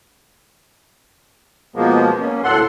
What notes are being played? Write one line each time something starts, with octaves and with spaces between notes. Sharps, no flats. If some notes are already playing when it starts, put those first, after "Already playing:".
B2 F3 G#3 A#3 B3
A#3 C#4
D2 A2 A4 F#5 C6